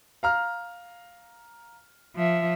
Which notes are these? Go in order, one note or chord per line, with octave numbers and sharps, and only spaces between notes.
F5 A#5 F6
F3 E5